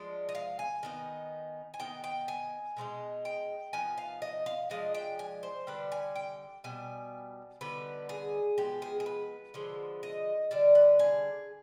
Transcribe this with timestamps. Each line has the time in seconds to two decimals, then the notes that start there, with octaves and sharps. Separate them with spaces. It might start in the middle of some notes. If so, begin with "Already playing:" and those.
Already playing: F3 G#3 D4
0.29 D#5
0.35 F5
0.59 G#5
0.83 D#3 B3 D#4
1.74 G#5
1.80 D#3 B3 D#4 G5
2.04 G5
2.28 G#5
2.77 B2 G#3 B3 D#4
3.25 G5
3.73 F3 B3 D#4 G#5
3.98 F5
4.22 D#5
4.46 F5
4.70 F3 G#3 D4 D#5
4.94 G5
5.19 G#5
5.43 C5
5.67 D3 G3 D4 B4
5.92 G#5
6.16 G5
6.64 B2 G3 G#5
7.61 D3 G3 B3 D#4 B4
8.09 G#4
8.57 F3 G#3 B3 G4
8.82 G#4
9.00 G#4
9.06 B4
9.54 D3 F3 G#3
10.03 D#5
10.51 D3 G3 D4 D5
10.75 B4
10.99 G#4